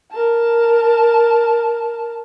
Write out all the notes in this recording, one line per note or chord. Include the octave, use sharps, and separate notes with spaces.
A#4 A5